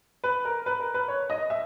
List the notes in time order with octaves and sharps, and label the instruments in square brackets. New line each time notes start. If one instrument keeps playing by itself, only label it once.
[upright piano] B4
A#4
B4
A#4
B4
C#5
D#5
E5